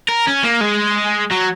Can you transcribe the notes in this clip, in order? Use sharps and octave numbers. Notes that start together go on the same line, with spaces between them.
A#4
C#4
A#3
G#3
F#3